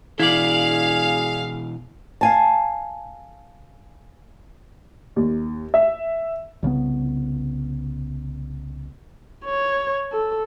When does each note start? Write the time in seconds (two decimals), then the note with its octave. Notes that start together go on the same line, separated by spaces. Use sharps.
0.20 B2 E3 E4 G#4 D5 F5
2.21 F5 G#5 A5
5.16 D#2
5.74 E5
6.63 C2 C#3 F3 B3
9.45 C#5
10.12 A4